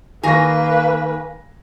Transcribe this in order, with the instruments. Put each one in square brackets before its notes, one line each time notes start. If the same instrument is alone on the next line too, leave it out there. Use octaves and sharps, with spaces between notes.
[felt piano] D#3 C#6 A#6 [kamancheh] A#3 B4 [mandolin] G#4 A#5